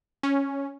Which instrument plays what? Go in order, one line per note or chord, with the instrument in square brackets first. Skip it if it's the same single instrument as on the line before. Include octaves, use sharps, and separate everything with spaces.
[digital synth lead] C#4